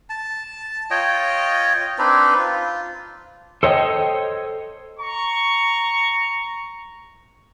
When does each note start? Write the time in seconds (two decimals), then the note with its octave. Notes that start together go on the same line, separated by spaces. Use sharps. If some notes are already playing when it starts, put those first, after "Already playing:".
0.10 A5
0.90 F4 C#5 D#5 G5
1.99 C4 D4 D#4 B4
2.39 F4
3.63 A4 C5 C#5 D#5 F#5 G5
5.00 A#5 C#6